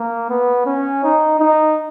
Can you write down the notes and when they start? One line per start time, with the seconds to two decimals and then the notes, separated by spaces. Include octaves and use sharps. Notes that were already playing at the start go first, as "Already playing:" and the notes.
Already playing: A#3
0.30 B3
0.66 C#4
1.04 D#4
1.39 D#4